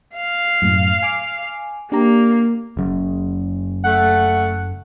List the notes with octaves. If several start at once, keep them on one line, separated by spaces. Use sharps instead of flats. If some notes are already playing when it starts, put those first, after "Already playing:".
F5
F#2 A2
G#5 D6
A#3 D4 G4 A#5
F#1 F#2
A3 F#5